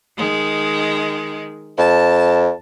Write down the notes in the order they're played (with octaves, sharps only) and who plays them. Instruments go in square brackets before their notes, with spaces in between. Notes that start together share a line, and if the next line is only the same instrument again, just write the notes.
[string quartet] D#3 G#3
[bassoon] F2 [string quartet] A5